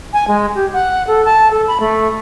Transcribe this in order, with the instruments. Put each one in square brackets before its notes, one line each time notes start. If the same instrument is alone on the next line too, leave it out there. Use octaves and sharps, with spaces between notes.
[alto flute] G#5
G#3
G4
F#5
A4
A5
A4
B5
A3